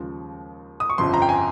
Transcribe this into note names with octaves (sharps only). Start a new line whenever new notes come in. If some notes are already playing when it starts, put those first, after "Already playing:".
Already playing: D#2 C#3 F3 G#3
D#6
C#6
G1 F2 C#3 F3 C6
A#5
G5
G#5